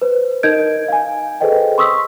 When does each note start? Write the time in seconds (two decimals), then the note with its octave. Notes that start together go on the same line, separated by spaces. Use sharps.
0.01 B4 C5
0.43 D#4 A#4 D#5 G6 G#6 D7
0.88 F5 G#5
1.41 G#4 A4 B4 C5 D#5 G5
1.78 C6 C#6 D#6 E6 B6